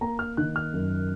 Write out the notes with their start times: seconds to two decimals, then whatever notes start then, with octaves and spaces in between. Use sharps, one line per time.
0.01 A#3 A#5
0.19 F6
0.37 D#3 F#6
0.56 F6
0.74 F#2